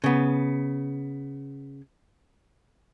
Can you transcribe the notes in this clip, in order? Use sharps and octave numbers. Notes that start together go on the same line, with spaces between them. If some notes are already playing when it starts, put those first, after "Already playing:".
C#3 B3